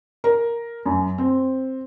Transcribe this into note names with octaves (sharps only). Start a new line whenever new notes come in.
A#4
F#2
C4